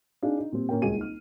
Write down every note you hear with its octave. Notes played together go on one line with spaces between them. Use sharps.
D4 D#4 G#4 F5
D#4
A#2 G3 C4
A#2 C#4 A#4 G5
D#1 C#2 G#4 G#5 D#7
D#4 F6